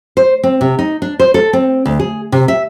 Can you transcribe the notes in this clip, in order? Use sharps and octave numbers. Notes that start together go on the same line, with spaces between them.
C5
C4
C3
D#4
D4
C5
A4
C4
D2
G#4
C3
E5